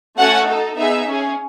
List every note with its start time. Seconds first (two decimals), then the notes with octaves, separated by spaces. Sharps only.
0.17 A3 C#4 F#4 A4 F#5
0.47 D#4 A4
0.76 B3 D#4 G#4 E5
1.05 C#4 G#4